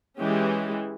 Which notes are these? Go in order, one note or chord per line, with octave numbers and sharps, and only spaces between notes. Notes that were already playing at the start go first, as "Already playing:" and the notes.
E3 G#3 C#4 G4